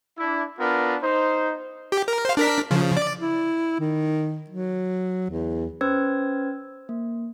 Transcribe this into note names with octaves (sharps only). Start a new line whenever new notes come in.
D4 E4
B3 D4 F4 A#4
D#4 C5
G4
A#4
C5 F5
D4 A#4 B6
C#3 F3
D5
E4
D#3
F#3
E2
C#4 B4 C5 E6 G#6
A#3